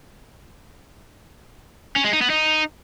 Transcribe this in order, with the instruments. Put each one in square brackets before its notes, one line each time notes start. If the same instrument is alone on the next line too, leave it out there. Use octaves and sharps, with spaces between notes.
[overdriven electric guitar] C#4
G#3
D#4
B3
D#4